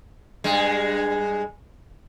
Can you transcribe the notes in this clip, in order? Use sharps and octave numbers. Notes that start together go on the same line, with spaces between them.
G2 G#3